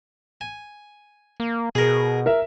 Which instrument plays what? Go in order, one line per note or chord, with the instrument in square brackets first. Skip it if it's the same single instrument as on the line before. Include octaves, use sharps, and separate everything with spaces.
[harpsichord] G#5
[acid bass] A#3
[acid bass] B2 [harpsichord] G#4 A#4
[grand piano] A#4 E5